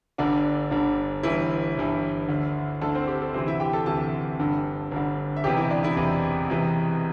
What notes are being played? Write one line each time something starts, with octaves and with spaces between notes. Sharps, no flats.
G1 G2 D3 D4 D5
G1 G2 D3
G1 G2 E3 E4 E5
G1 G2 E3
D2 D3
D2 D3 A4 A5
C4 C5
G4
A4
D2 C3 E3 C4 C5
E4 E5
G4 G5
A4 A5
D2 C3 E3 A4 A5
G1 G2 D3
G1 G2 D3
E5
E1 E2 C3 E3 G4 G5
E4 E5
D4 D5
E4 E5
E1 E2 C3 E3
E1 E2 C3 E3